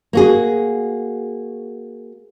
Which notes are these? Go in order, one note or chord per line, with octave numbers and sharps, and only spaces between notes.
A#3 F#4 G#4